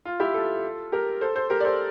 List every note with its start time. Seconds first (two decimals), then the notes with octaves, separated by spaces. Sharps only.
0.05 F4
0.20 E4 G4
0.34 F4 A4
0.92 G4 A#4
1.21 A4 C5
1.35 A4 C5
1.50 G4 A#4
1.60 D5
1.65 A4 C5